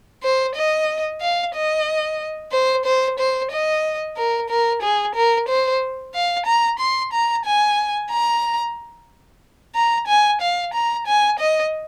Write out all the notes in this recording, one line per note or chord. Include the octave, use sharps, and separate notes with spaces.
C5
D#5
F5
D#5
C5
C5
C5
D#5
A#4
A#4
G#4
A#4
C5
F5
A#5
C6
A#5
G#5
A#5
A#5
G#5
F5
A#5
G#5
D#5